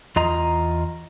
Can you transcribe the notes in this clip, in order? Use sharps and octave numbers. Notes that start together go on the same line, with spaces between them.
E2 F4 D#5 A#5